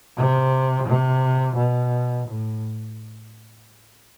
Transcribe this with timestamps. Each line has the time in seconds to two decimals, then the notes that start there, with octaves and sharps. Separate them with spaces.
0.17 C3
0.87 C3
1.56 B2
2.27 A2